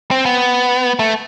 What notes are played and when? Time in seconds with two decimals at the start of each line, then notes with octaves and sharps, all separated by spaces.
0.11 C4
0.25 B3
0.99 A3